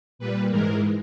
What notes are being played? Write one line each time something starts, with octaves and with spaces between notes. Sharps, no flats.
A#2 G3 B4
G#2 E3 G#3 A#4